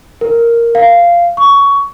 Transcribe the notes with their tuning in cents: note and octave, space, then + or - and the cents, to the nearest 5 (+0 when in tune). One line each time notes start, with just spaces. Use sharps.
A#4 +0
F5 -10
C#6 +15